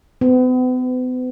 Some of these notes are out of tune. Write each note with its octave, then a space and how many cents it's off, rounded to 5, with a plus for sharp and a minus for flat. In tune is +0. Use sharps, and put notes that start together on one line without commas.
B3 +40